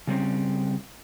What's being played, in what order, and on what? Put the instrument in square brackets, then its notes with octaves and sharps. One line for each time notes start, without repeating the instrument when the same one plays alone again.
[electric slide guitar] C#3 G3 C4 C#4